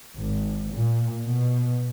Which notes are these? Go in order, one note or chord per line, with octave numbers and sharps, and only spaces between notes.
G#1
A#2
B2